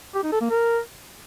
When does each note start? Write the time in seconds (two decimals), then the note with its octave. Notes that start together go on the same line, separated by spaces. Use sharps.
0.14 G4
0.23 D#4
0.32 A4
0.41 A#3
0.50 A#4